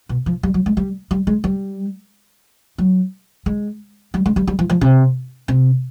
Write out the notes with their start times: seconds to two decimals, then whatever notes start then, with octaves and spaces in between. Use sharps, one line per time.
0.09 B2
0.26 F3
0.43 G3
0.54 F#3
0.66 G#3
0.77 G3
1.11 G3
1.27 G#3
1.44 G3
2.78 F#3
3.46 G#3
4.14 G3
4.26 G#3
4.36 G3
4.47 G3
4.59 F3
4.70 F3
4.81 C3
5.48 C3